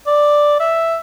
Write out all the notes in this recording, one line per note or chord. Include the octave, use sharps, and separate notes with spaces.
D5
E5